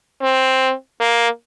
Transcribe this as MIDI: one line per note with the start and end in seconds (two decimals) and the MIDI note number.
0.22 0.72 60
1.00 1.28 58